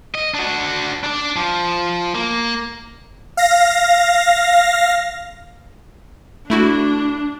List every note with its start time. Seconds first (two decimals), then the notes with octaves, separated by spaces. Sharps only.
0.15 D#5
0.34 D4 F#4
1.04 D4 D5
1.36 F3
2.15 A#3
3.37 F5 A#6
6.50 A3 D4 E4 F#4